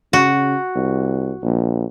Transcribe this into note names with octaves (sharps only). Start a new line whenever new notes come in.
C#3 F#4
C2
A#1